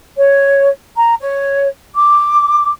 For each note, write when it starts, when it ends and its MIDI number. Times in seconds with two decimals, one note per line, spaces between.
0.17 0.69 73
0.96 1.15 82
1.20 1.67 73
1.95 2.70 86